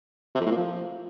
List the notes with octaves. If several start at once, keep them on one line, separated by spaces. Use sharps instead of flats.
C3
F2
A2
A#2
F3